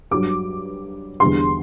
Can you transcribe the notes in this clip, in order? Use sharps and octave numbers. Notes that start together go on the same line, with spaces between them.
G2 F#3 D6
E2 D3 G3 C6